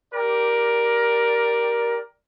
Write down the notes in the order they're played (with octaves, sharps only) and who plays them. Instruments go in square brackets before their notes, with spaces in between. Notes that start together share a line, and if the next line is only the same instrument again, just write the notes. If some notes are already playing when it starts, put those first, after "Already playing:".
[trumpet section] G4 A#4 D5